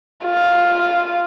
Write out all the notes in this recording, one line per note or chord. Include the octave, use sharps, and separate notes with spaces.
F4